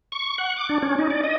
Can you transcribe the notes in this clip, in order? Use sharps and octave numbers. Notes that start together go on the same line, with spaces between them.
C#6
F#5
D6
D4
C#4
D#4
D5
D#5